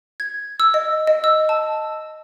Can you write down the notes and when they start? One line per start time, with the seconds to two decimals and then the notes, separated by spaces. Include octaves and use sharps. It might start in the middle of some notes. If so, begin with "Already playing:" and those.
0.20 G#6
0.60 E6
0.74 D#5
1.07 D#5
1.24 E6
1.49 A5